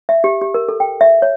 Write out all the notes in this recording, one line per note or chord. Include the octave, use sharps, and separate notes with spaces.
E5
G4
G4
A#4
A4
G5
E5
C#5